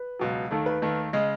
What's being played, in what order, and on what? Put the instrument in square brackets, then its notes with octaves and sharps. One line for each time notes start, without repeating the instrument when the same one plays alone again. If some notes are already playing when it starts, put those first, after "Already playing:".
Already playing: [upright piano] B4
[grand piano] C#2 B2 F#3
[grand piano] D#2 D#3 A3 [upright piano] A4
[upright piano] B4
[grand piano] D#2 D#3 A3
[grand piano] C#3 G#3 [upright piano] D#5